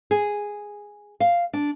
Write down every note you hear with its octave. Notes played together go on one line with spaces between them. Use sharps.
G#4
F5
D4